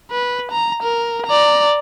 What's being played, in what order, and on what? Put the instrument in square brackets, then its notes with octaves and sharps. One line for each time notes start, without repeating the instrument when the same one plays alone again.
[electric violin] B4
A#5
A#4
D5 A#5